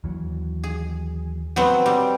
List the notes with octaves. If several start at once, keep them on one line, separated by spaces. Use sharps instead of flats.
D#2 E3 F#3
G#4
F#3 B3 C4
G3 C4